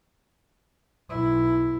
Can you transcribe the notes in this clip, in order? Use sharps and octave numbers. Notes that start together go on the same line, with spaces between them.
B1 E4